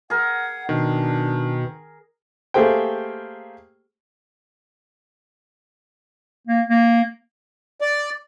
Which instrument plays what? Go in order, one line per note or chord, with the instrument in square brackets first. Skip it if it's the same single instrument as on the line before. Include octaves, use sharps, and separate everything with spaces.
[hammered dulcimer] G#4 A#4 [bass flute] F#5
[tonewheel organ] B2 [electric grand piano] D#3 [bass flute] D4
[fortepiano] A3 A#3 G4 G#4 C5 G5
[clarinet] A#3
A#3
[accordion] D5